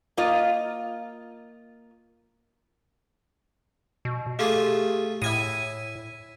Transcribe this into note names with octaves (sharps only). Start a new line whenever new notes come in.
A#3 F4 D#5
B2
A3 F4 G4 G#4
A2 E4 G#5 D#6